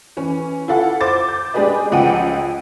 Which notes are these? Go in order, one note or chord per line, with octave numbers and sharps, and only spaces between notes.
E3 C#4
E4 F4 A4 F#5
C5 D6 A6
G6
G#3 D4 G4 G#4 B4 D#5
C#2 F3 D#5 F#5 G5 D#7